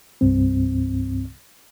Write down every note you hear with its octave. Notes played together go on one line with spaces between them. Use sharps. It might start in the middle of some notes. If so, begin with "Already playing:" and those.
C2 G2 C4